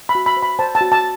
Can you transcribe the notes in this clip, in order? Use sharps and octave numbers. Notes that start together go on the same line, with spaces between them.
B5
F#4
B5
C5
B5
C5 A5
A5
F#4
A5